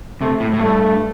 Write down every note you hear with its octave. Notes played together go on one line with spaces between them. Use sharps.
C3 A3
A2
A2
G2 A3